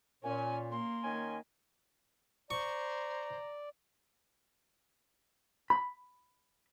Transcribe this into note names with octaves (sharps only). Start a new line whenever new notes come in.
A#2 C#4 G#5
A#3 C6
D#3 C#4 G#5
C5 D5 A#5 C#6
B5